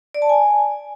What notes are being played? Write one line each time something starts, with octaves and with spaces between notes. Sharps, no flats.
D5
A5
G#5